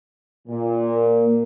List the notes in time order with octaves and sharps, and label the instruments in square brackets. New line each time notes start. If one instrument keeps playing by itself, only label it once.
[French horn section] A#2
[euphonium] A#3